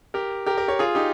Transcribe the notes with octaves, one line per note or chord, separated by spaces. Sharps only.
G4 A#4
G4 A#4
G4 A#4
A#4 C#5
F4 G#4
D#4 G4